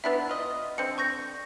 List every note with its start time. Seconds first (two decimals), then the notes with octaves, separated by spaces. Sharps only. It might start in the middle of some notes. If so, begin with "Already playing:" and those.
0.04 B3 D4 E4 E5
0.29 F4 D#5
0.78 D3 C4 C#7
0.98 C#6 G6 A#6